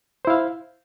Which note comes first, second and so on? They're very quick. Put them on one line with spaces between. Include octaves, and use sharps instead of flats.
C5 E4 F5